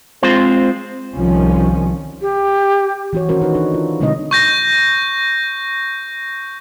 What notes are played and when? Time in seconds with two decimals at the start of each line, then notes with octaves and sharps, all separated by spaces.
0.23 G#3 C4 F4 C5
1.14 C2 D#3 F3 C#4
2.21 G4
3.13 E3 F#4 C#5
3.29 D#3 C#4 F#4 A#4 C5
3.42 D#4 B4
3.55 D4 D#4 A4
3.74 F4
4.00 B2 D3 G#3 C4 D#4 D#5
4.31 C#6 G6 A#6